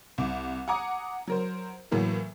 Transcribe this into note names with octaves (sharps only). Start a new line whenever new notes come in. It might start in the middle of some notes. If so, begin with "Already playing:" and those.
C2 D6
F#5 G#5 A#5 D6 D#6
F#3 A#4 C5
A2 E3 F#3 A#3 B3